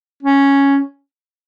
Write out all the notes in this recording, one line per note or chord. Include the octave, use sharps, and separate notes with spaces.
C#4